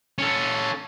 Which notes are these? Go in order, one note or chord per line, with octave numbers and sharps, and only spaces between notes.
C#4 A4